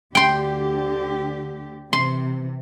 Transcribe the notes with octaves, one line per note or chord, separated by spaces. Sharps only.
D2 D3 G4 G5 C6
C3 E3 C6